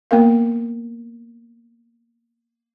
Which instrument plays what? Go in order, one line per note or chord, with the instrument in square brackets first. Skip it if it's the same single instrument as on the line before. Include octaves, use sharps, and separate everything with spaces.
[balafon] A#3 B3 A#4 F5